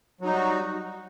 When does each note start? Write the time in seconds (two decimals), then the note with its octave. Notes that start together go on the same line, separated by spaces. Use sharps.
0.21 F#3
0.25 D#4
0.29 G3
0.34 F#4